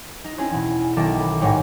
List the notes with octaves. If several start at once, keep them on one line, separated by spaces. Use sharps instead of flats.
D#4
C4 C#4 D#4 E4 G#4
E2 B2
B1 D#3 D#4 A4 E5 D6
B3
A1 G#2 D#3 D#4 C#5 G5